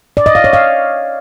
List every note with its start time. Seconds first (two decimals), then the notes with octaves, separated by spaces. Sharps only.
0.17 D5
0.26 D#5
0.35 F5
0.44 C#5
0.53 F5